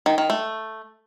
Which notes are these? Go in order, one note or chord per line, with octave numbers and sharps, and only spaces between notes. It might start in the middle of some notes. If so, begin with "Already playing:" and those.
D#3
D#3
A3